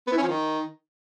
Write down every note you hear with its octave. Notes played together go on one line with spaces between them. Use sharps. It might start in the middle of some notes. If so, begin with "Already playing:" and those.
B3
E4
C#4
F3
D#3